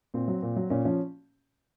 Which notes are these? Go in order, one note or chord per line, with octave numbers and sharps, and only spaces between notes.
A#2 C4
F#3
A#2
F#3
A#2 C#4
F3 C#4